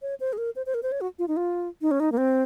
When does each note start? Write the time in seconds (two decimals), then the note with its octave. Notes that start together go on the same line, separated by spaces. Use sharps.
0.02 C#5
0.20 C5
0.33 G#4
0.38 A#4
0.56 C5
0.66 C5
0.74 A#4
0.83 C5
0.92 C#5
1.01 F#4
1.19 F4
1.28 D#4
1.37 F4
1.82 D#4
1.91 C#4
2.00 D#4
2.12 A#3
2.18 C4